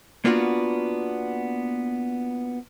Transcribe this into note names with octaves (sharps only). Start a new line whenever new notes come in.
A#3 B3 D4 F4 F#4